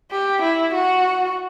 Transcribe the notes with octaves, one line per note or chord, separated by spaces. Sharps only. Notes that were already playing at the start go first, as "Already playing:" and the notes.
G4
E4
F#4